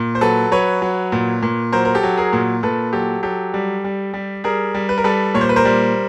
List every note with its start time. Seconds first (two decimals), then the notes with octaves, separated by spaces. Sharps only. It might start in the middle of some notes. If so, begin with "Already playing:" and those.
Already playing: A#2
0.15 C5
0.21 F#3 A4 B4
0.51 F#3 B4 C#5
0.82 F#3
1.12 A#2
1.43 A#2
1.72 F#3 A#4 C5
1.85 A#4
1.95 G4 A4
2.03 F#3
2.18 G#4 A#4
2.33 A#2
2.63 A#2 A4 B4
2.93 F#3 G4 A4
3.23 F#3 G4 A4
3.54 G3
3.84 G3
4.14 G3
4.44 G3 G#4 A#4
4.74 G3
4.89 B4
4.98 A#4
5.04 G3 A4 B4
5.34 A#2 C#5
5.41 C5
5.49 B4
5.56 A#4 C5
5.65 G3